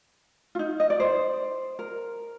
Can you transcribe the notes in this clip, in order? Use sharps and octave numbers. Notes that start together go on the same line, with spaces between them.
F4
D#4
D#5
D5
C5
A#4